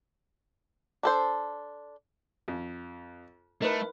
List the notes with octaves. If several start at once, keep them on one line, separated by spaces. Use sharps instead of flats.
D4 A4 C5
F2
A3 D#4 A#4 B4